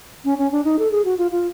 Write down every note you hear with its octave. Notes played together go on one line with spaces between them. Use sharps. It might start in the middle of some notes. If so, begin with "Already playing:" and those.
C#4
C#4
D4
D#4
A4
G#4
F#4
F4
F4